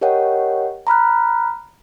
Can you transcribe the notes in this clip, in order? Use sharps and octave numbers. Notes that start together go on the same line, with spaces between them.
G4 A#4 C#5 D#5 F#5 G5
A#5 B5 F6 F#6